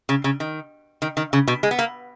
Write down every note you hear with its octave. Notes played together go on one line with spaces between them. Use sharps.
C#3
C#3
D#3
D#3
D#3
C#3
B2
G#3
B3
A#3